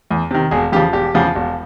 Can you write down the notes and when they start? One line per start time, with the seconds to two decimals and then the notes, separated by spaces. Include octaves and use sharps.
0.11 E2
0.31 C3 D#3
0.51 E1 G#4
0.72 E2 C#3 F3 G4
0.93 E1 G4
1.14 E2 C#3 F3
1.35 E1